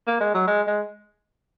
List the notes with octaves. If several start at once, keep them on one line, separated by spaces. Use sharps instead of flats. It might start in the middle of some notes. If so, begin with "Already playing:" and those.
A#3
G#3
F#3
G#3
G#3